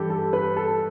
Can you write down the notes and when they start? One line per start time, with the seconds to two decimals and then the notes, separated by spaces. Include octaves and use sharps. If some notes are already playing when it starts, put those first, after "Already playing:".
Already playing: G2 E3 G3 G4 A4
0.10 A4
0.33 B4
0.57 A4